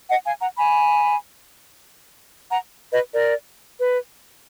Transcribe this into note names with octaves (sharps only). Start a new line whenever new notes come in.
D#5 F#5
F5 G#5
F#5 A#5
G#5 B5
F#5 A#5
B4 D#5
A#4 D5
B4